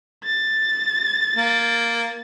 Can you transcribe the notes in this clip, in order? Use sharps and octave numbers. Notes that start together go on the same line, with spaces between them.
A6
A#3